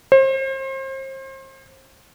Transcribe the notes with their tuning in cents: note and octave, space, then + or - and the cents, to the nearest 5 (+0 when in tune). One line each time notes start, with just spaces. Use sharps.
C5 +35